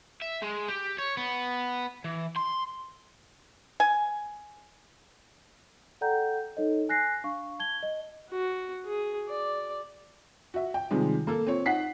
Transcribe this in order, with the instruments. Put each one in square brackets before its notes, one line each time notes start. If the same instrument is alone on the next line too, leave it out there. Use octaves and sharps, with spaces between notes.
[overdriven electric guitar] E5
G#3
G4
C#5
B3
E3
C6
[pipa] G#5
[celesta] A4 D5 F#5 G5 A#5 G6
D#4 A4 C#5 D#5
G#5 F#6 A#6 C7
D4 F5 C#6
A5 G#6 G7
D#5
[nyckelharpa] F#4
G#4
D5
[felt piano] F#4 E5
G5
C3 D#3 F3 G3 G#3
A#3 A4
C4 F4 C#5
D#4 F#5 B6 C7